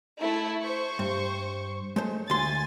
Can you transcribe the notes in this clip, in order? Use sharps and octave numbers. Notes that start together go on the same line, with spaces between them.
A3 E4
C5 C#6
G2
G#3 A3 C5
D2 G#5 C6 A6